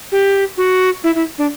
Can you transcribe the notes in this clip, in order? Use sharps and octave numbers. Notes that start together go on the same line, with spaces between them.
G4
F#4
E4
E4
D4